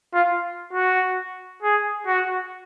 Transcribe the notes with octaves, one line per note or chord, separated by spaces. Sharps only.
F4
F#4
G#4
F#4